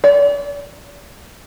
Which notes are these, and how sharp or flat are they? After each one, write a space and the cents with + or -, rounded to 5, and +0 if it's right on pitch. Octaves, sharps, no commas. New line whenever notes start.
D5 -45